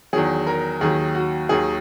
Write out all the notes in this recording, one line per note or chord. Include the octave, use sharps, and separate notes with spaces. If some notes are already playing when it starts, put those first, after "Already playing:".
E2 D#3 F#3 G#4
A#4
D#2 D#3 F#3 G#4
F#4
D#2 D#3 F#3 G#4